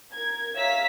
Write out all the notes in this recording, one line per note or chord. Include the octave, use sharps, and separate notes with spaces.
A#4 G#6
C#5 E5 F5 A#5 E6 B6